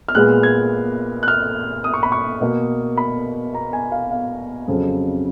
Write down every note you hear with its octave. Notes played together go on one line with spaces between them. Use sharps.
F6
A#2 G#3 B3 F#6
G#6
F#6
F6
D#6
C#6
B5
C#6
B2 A#3
B5
A#5
G#5
F5
F5
F2 C#3 F#3